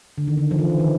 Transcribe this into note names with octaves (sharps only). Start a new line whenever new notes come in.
D3
D#3
D3
F3
E3
D#3
D#3